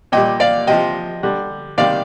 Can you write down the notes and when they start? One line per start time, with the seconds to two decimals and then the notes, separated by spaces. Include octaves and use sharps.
0.12 A#2 D#5 G5
0.17 G3
0.40 D5 F5
0.67 C3 F3 D#5 G5
1.23 D3 G3
1.78 C3 D#3 G3 D5 F5